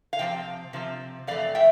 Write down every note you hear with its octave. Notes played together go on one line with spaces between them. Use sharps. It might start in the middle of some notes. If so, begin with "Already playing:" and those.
F5
C3 F3 C4 G5
C3 F3 C4
F2 E3 A3 C4 D5 F5
E5 G5